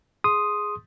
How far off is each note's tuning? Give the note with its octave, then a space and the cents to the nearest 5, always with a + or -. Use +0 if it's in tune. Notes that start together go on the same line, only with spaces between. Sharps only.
G#4 +0 C6 +0 D#6 +0